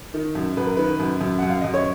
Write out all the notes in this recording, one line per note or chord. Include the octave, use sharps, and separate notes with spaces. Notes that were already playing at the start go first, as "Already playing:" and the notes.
D#3
F#2
F#2 B4
A#4
D#3 B4
F#2
F#2
F#2 F#5
F5
F#2 D#5
C#5